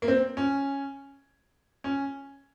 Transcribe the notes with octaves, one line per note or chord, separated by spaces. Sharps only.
A#3
C4
C#4
C#4